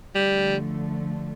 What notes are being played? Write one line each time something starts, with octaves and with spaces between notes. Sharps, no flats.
D3 F3 G3 A3